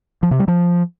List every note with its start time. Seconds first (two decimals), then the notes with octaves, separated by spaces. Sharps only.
0.23 F3
0.31 C3
0.39 G3
0.48 F3